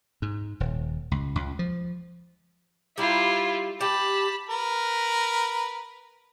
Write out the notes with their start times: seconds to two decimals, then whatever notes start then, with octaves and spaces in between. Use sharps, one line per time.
0.22 G#2
0.60 D#1
1.11 C#2
1.36 C#2
1.59 F3
2.98 G3 E4 F4 A#5
3.81 G4 A5 B5
4.49 A#4 B4